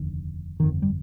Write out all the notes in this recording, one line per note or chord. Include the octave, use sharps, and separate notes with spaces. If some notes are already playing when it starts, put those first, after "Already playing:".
Already playing: F1 D#2 D3
G1 F2 D3 D#3
G3